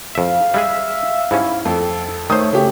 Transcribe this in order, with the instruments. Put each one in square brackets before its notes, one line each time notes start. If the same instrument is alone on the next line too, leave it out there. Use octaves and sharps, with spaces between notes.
[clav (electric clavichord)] F2 E5 [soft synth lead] F5
[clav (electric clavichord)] G3 G#3 G#4 [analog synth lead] E5
[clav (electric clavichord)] G#2 G3 C#4 [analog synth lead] E4
[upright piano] F2 [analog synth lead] A4
[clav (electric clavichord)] D#3 C5 [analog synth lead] A3 [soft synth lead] C#5 [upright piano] D#6
[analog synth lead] C#3 [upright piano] A3 G4